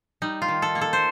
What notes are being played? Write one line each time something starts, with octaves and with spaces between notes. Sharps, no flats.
G3 D#4
F4
D#3
A4
A#3
A4
C5